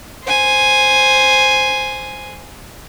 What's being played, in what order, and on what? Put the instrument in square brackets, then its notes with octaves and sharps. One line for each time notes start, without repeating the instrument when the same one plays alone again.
[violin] C5 G#5